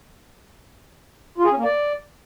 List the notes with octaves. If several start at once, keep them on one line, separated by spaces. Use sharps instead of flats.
F4
G#4
C#4
A#3
D5